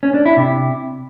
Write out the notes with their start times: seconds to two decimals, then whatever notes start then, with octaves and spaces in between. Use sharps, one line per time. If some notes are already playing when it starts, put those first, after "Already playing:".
0.03 C#4
0.14 D4
0.26 E4
0.37 C3